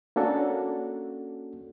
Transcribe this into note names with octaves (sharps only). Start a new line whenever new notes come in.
A#3 C#4 D4 F#4 A4